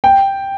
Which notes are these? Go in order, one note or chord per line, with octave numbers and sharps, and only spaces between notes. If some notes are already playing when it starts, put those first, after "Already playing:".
G5